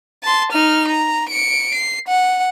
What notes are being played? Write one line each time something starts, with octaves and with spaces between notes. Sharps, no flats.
A5 C6
D#4 F6
A#5
C#7 D7
C7
F#5